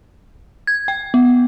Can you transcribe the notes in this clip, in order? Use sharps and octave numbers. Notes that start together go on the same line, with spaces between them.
G#6
G5
B3